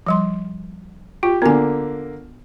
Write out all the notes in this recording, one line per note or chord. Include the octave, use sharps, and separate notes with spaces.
F3 G3 C6
F4 G4
D3 A#3 B3 G#5